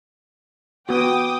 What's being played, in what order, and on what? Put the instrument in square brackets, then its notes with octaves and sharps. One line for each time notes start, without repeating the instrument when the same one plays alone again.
[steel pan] B3 F#4 [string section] G5 D6 D#6